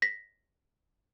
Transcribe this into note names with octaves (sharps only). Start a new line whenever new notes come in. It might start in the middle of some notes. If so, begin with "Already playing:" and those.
A#6 B6